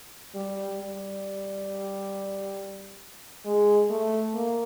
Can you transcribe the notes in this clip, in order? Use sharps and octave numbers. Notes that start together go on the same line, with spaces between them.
G3
G3
G#3
A3
A#3